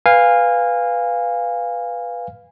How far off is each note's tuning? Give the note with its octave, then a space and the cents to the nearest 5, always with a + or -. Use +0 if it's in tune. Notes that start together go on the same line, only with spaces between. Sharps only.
B4 +0 F5 +0 G#5 -25